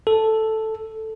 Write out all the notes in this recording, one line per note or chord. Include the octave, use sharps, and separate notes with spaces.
A4